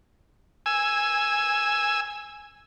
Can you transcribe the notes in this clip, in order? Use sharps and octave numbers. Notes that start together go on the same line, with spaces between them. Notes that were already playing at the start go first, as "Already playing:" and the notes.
G#5 E6